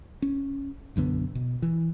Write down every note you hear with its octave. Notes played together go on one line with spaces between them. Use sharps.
C#4
B1 F#2 D3 B3
B2
E3